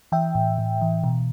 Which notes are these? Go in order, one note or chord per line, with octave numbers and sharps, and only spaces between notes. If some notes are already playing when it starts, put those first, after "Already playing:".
E3 E5 G5
A2
A2
E3
B2